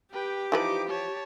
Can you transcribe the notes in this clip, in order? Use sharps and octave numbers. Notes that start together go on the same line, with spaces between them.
G4 B4 G5
E3 F3 D#4 B4 D6
C#5 A5